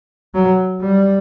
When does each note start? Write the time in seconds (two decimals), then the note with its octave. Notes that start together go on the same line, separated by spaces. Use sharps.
0.34 F#3
0.81 G3